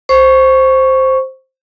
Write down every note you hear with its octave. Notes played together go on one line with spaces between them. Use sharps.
C5 C#6